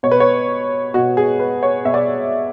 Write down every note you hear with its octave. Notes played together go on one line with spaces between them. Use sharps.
B2 C#5
B4
C#5
B2 F#4
G#4
B4
C#5
B2 E5
D5